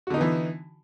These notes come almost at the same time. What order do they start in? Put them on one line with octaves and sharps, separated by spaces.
F#4 D3 D#4 B3 E3